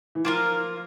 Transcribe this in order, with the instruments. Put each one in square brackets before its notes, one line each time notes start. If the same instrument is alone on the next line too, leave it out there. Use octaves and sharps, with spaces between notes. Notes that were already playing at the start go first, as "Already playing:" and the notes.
[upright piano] E3
[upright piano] F3 [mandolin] A#3 F4 A#4